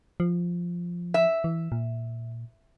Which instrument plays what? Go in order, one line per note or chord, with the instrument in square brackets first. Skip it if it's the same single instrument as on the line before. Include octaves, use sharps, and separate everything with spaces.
[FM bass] F3
[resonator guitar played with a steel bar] E5
[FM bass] E3
A#2